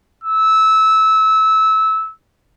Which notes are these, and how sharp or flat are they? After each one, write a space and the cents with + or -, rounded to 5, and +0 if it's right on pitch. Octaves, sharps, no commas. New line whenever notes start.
E6 -20